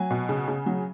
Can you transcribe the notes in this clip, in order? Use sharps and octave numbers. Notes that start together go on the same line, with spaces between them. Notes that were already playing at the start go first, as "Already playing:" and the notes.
Already playing: F#3 G#5
B2
C#3
C#3
F#3